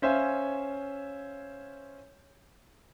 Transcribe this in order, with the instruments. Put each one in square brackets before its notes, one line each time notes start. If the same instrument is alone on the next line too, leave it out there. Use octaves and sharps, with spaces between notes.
[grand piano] C#4 C5 E5 F5 G#5